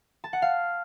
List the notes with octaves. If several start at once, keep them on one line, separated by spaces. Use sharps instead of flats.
A5
F#5
F5